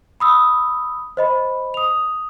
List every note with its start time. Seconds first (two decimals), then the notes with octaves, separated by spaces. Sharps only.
0.20 B5 D#6 E6
1.17 C5 D#5 B5
1.74 D#6 F7